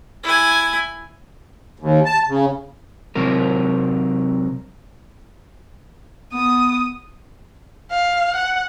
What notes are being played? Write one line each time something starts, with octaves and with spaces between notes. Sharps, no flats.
E4 G#5
D#2
A5
C#3
C3 F#3 C4 A#4
B3 D#6
F5
F#5